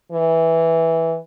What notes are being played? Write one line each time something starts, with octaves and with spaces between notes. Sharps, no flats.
E3